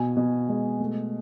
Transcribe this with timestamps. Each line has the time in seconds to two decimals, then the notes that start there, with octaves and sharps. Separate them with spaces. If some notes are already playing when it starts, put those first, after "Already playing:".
Already playing: B2 G#5
0.17 B2
0.49 G#3
0.80 A3